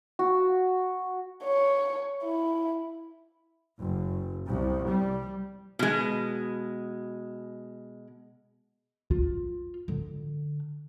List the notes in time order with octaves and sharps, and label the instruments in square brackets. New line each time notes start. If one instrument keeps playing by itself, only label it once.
[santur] F#4
[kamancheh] C#5
E4
[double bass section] F#1
C2
G3
[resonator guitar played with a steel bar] B2 G#3
[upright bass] F4
D3